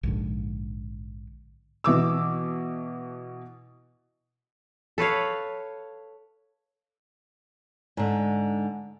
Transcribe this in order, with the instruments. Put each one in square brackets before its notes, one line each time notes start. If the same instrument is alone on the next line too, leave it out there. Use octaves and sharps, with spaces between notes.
[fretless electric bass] A#1 G#2 D3
[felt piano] B2 E3 D6 E6
[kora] A4 B4 C#5 F5
[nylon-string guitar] G#2 D3